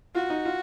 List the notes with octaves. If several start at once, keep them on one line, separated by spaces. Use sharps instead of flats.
F4 F#4
D#4
F4